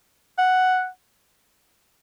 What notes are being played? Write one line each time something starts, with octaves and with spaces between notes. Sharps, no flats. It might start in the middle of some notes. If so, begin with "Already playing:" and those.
F#5